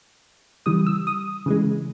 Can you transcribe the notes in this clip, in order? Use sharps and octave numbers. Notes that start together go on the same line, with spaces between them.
C#3 E3 G3 D#6
E6
D#6
C#3 E3 G#3